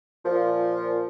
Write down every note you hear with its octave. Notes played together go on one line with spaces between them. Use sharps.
A#2 F3